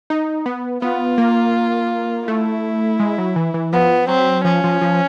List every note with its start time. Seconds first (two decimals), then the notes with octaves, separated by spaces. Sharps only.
0.10 D#4
0.46 B3
0.82 B3 F4
1.18 A#3
2.27 A3 E4
3.00 G#3
3.18 F#3
3.36 E3
3.54 E3
3.73 F3 B3
4.08 F#3 C4
4.45 F3 C#4
4.64 F3
4.81 F3